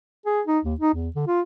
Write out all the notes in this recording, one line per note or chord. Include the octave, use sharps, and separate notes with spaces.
G#4
D#4
D#2
D#4
E2
D3
F4